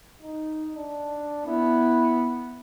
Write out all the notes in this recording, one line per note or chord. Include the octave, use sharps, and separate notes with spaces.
D#4
D4
B3 E4